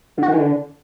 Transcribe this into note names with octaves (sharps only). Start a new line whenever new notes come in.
D3
F#4
D#3
E3
D3